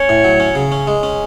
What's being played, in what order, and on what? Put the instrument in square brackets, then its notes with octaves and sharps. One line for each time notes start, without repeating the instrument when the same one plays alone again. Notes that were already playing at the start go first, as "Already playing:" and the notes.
Already playing: [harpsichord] C#4 [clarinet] C#5
[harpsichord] A2
F#3
C#4
C#3
C#4
G#3
C#4